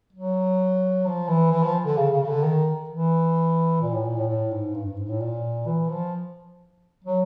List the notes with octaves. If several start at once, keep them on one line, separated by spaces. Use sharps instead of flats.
F#3
F3
E3
E3
F3
D3
C#3
C#3
C#3
D3
D#3
E3
A#2
A2
A#2
A2
A2
G#2
G2
G2
G#2
A2
A#2
E3
F3
F#3